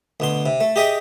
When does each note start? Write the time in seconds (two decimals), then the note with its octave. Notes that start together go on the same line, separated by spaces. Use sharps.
0.20 D2 B2 C6
0.46 C3
0.60 A3
0.76 G4 G#4 D#5 E5 G5